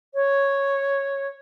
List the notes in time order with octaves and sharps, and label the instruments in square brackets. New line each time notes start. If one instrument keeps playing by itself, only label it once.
[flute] C#5